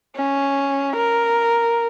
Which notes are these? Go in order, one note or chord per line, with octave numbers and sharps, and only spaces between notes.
C#4
A#4